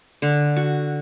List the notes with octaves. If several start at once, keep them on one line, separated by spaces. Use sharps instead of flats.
D3
F#4